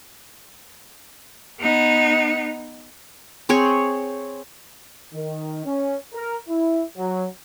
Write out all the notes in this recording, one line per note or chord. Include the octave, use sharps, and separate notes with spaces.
B3 D#4
C4 G#4 C#5
D#3
C#4
A#4
E4
F#3